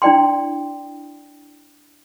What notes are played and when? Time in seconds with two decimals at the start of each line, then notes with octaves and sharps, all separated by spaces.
0.02 D4 E4 D5 G5 C6